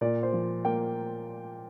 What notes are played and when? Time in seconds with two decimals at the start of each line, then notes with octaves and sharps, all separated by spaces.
0.01 A#2 D5
0.23 C5
0.33 F3
0.65 A#3 G5